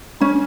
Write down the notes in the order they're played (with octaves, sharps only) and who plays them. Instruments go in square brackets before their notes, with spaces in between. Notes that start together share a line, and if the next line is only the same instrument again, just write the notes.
[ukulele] C#4 [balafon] D4